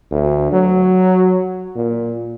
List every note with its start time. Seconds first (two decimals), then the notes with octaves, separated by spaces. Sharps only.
0.11 D2
0.52 F#3
1.75 A#2